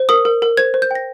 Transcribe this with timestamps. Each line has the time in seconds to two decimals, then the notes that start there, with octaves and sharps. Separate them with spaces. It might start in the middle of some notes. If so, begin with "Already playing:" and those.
Already playing: C5
0.09 A#4 D#6
0.25 A#4
0.42 A#4
0.57 C5 G#6
0.74 C5
0.82 G6
0.91 G5 A#6